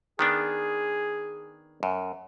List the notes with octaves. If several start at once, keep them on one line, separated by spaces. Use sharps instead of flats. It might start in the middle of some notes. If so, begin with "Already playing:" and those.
D#3 B3 D4 G#4
F#2